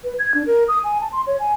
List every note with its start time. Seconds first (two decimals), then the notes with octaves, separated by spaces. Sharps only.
0.04 B4
0.19 G#6
0.34 D4
0.46 A#4
0.68 D#6
0.84 G#5
1.01 A5
1.12 C6
1.27 C#5
1.40 G#5